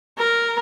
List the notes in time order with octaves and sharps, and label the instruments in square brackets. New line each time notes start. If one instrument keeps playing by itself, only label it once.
[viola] A#4